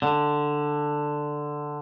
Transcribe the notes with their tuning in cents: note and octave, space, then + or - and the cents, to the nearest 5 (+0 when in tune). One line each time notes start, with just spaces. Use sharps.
D3 +10